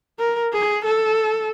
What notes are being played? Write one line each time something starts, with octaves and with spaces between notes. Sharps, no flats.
A#4
G#4
A4